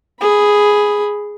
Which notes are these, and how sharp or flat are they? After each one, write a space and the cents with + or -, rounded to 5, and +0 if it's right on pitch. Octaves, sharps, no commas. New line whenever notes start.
G#4 +0 B5 +0